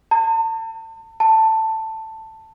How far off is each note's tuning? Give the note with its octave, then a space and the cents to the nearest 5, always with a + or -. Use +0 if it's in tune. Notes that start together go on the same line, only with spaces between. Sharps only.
A5 +40
A5 +10